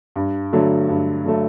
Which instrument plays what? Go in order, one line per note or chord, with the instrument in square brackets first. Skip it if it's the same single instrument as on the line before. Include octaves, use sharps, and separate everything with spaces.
[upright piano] G2
D3 F#3 A3
G2
D3 F#3 A3